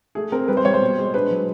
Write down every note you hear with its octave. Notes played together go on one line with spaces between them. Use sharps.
A3 G#4
C4 A#4
G3 B4
C5
G3 C#5
C5
B2
G#3
D4 B4
F#3